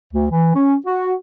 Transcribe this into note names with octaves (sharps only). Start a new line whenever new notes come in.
D2
E3
C#4
F#4